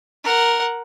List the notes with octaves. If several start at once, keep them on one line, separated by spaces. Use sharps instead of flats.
A#4 F#5